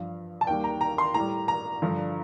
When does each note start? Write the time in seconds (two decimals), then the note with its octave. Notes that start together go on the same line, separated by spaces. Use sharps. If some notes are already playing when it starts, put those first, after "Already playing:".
Already playing: G2 F3 F5
0.41 A5
0.47 D#2 D#3 G3 G5
0.64 A#5
0.81 A#5
0.98 C6
1.14 A2 G3 A#5
1.48 A#5
1.82 G2 D3 F3